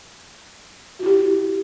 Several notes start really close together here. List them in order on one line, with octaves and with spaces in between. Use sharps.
F#4 E4 G4